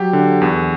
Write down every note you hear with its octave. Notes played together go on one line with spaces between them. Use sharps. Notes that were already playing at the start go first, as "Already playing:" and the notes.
Already playing: F#3 G4
D3
E2